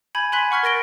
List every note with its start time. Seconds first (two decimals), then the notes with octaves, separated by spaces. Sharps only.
0.15 G#5 B5 G6 G#6
0.32 G#5 B5 C6 F#6 G#6 B6
0.51 F#5 C#6 F6 G#6 B6
0.63 A#4 A6 A#6 D7 G7